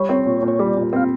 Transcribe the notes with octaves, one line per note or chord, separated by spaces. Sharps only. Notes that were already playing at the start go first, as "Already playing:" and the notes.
Already playing: G3 C#5
C4
A#2
A#2
C#5
G3 D5
A#2
C4 F5